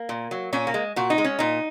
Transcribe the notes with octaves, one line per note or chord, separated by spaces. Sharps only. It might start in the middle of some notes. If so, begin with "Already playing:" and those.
Already playing: A#3
A#2
F#3
A#2 C#4
A#3
G#3
A#2 F#4
D#4
G#3
C#4
A#2 D#4